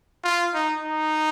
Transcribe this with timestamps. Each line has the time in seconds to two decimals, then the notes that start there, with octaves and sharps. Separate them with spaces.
0.24 F4
0.54 D#4
0.83 D#4